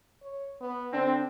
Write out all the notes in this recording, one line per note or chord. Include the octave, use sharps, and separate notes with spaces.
C#5
B3
D3 C4 D4